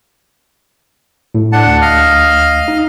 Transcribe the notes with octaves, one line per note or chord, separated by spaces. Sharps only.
A2
D4 F#5 A5
D2
D#5 F5 F6
D#4